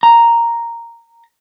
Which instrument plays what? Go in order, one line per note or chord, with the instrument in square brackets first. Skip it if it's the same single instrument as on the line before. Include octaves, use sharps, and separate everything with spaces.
[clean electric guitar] A#5